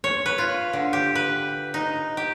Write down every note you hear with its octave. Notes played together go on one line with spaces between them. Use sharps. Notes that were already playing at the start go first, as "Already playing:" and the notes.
C#5
B4
F4
D3
G4
B4
D#4
G4